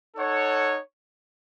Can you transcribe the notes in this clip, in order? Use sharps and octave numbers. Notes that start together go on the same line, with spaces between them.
D#4 A4 C#5 F#5